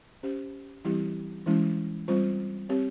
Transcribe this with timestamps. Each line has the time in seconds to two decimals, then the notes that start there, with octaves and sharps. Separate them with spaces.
0.23 C#4 G4 C5
0.85 E3 G3 C4 E4 G4
1.46 E3 G#3 C#4 E4
2.08 G3 C4 F4 C5
2.69 C4 G4 C#5